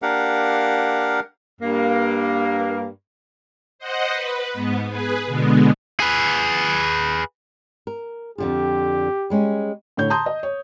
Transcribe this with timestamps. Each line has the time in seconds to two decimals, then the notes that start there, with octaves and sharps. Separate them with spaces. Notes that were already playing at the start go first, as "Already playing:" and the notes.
0.02 A#3 D4 G4 A#4 F5 F#5
1.62 G2 A#3
3.79 C5 D#5 F#5
4.10 B4
4.54 G#2 B3
4.89 G#4 B4
5.26 B2 D3 G#3 B3
6.00 G#4 B4
7.87 A#4
8.38 F2 D3 F4 G4
9.30 G3 G#3 C#4
9.97 A2 D3 C#5 G6
10.10 A5 A#5 C6 D#6 G6
10.26 D#5
10.43 C#5